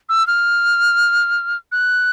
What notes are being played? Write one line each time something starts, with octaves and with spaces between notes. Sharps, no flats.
E6
F6
F#6